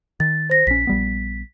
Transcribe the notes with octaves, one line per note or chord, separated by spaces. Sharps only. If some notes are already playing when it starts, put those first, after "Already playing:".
D#3 A6
C5 A#6
A#1 C#4 B6
A#1 G3 B3